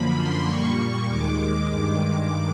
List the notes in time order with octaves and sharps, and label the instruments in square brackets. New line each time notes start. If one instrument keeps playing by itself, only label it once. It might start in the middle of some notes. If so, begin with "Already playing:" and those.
Already playing: [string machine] F#2 D3 F3 A#3 B5
C6
A#2 G3 A#3 C#6
D#2 D#3 G#3 D6
G2 D#3 G#3 D6
D6